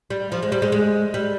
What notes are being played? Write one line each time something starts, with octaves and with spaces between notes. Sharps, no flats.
G3
F3
G#3
G3
G#3
G#3
G3